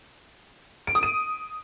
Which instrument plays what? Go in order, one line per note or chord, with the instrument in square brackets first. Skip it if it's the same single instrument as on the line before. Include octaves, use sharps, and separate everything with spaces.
[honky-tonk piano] D7
D#6
D#7